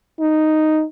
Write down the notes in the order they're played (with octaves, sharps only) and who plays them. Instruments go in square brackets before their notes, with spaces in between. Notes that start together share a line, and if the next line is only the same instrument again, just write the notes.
[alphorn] D#4